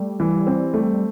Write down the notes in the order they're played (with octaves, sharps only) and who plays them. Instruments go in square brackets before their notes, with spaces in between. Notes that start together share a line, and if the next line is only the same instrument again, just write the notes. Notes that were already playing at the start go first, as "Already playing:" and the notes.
Already playing: [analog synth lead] G3 [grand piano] A3
[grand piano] E3
C4
A3